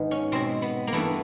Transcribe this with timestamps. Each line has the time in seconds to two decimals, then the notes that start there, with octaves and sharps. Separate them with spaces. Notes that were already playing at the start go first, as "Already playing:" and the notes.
Already playing: G#2 D#3 G#3 B3
0.11 C#4
0.32 B2 G#3 C4
0.62 B3
0.87 A#3
0.93 G2 E3 A3 B3